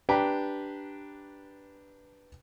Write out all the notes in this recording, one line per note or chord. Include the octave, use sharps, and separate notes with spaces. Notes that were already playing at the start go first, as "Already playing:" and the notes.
D4 G4 B4 G5 A#5